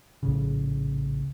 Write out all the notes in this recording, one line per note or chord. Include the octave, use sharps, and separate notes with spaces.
A#1 A2 C#3